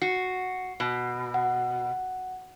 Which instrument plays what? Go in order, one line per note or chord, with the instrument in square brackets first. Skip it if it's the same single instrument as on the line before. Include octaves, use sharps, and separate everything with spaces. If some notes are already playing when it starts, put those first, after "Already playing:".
[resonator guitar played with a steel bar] F#4 [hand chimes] C7
[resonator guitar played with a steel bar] B2
[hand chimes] F#5